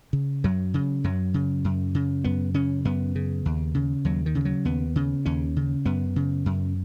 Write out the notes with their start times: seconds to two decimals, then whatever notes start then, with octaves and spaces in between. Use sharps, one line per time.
0.13 C#3
0.44 F#2 F#3
0.74 C#3
1.04 F#2 F#3
1.34 C#3
1.64 F#2
1.95 C#3
2.24 F#2 B3
2.54 C#3 C#4
2.85 F#2 B3
3.15 C#3
3.45 D#2
3.74 C#3
4.05 D#2 F#3
4.26 D#3
4.35 C#3
4.45 F#3
4.65 D#2 B3
4.96 C#3
5.26 D#2 C#4
5.56 C#3
5.85 F#2 B3
6.16 C#3
6.46 F#2